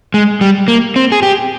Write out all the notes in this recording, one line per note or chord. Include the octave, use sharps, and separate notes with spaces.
G#3
G3
A#3
C4
G#4
G4